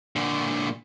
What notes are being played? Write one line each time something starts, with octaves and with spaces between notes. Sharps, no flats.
A#2 D3